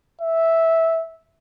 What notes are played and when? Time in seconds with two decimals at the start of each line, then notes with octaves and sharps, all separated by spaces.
0.21 E5